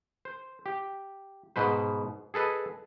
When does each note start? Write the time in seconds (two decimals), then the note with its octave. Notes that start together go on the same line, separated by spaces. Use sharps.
0.25 C5
0.66 G4
1.56 G#2 B2 B4 C5
2.34 G#4 A4 B4 D#5